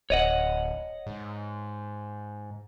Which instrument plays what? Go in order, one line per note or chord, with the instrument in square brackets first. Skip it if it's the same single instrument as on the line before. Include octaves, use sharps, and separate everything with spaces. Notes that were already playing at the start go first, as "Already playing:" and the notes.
[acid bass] D1 [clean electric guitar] C#5 D#5 F#5
[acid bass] G#2